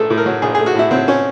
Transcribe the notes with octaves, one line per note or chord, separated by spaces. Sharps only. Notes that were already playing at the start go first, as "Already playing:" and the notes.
Already playing: A#1 A3 G#4 A4
A2
A#4
F#3
A#1 G#4
G#4
A3
F#4
A2 E4
F#3 C4
C#4